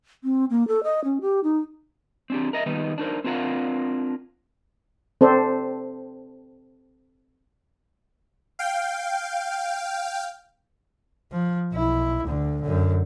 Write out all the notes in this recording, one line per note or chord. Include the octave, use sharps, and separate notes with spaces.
C4
A#3
A4
D#5
C#4
G4
D#4
C4 D4 G4
A#4 D#5 E5
D#3 G3 B3 D#4
D4 D#4 A#4 C5
C4 D4 F4 A#4 F5 F#5
C4 A4 C5 D5
F5 G5
F3
B1 E4
D2 D3
F#2 D3